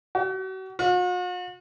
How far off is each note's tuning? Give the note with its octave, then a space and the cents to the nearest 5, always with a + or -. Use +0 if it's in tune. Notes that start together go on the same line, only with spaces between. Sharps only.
F#4 +40
F#4 -45